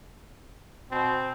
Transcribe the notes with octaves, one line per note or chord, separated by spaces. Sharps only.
B2 C4